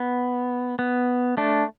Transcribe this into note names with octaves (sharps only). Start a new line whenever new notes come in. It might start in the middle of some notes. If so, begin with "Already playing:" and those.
Already playing: B3
B3
A3 D4